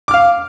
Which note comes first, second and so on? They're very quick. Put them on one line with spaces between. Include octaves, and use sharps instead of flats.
D6 F6 F5